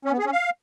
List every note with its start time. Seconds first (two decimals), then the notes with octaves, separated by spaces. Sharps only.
0.05 C#4
0.12 B3
0.19 G#4
0.26 C#4
0.32 F5